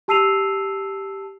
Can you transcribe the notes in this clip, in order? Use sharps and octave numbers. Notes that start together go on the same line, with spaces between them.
G4 A5 E6 C7 D#7 F7